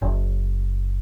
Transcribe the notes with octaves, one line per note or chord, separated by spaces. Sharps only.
F#1